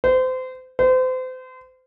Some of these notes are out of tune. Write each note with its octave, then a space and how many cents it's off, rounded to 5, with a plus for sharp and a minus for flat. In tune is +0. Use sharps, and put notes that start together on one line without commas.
C5 -30
C5 -35